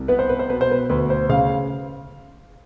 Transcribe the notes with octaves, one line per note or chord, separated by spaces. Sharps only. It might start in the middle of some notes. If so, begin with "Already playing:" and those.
Already playing: C2
B3 B4
C5
B4
C5
B2 B4
C5
B4
D2 B4
C5
C#3 F5